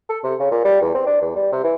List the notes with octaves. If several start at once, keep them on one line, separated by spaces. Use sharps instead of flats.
A4
C3
C#3
A#2
G3
E2
C4
D4
E2
G3
C3
E3